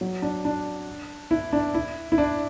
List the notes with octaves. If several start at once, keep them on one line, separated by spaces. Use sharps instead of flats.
F#3
D4
D4
E4
D4
E4
E4
D4